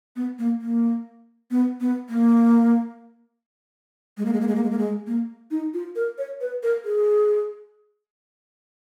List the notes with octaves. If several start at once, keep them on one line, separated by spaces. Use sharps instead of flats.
B3
A#3
A#3
B3
B3
A#3
G#3
A#3
G#3
A#3
G#3
A#3
G#3
A#3
G#3
A#3
D#4
F4
A#4
C#5
B4
A#4
G#4